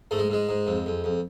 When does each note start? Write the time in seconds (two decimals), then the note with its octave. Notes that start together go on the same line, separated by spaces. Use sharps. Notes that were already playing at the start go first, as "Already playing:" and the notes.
0.11 G#2 A3
0.19 G#3
0.30 G#2 G#3
0.49 G#2
0.67 F2
0.86 F2
1.04 F2